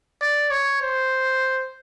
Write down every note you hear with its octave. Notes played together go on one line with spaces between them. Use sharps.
D5
C#5
C5